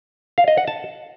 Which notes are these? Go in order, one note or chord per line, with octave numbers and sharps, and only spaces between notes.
F5
D#5
F#5
A5